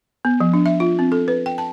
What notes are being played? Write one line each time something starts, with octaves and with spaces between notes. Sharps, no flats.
B3
F3
D4
E5
F4
C4
A4
B4
G5
A5